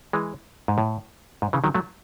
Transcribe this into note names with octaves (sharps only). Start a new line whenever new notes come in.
E3 G#3
G#2
A2
G#2
C#3 E3
D#3 F#3
F#3 A3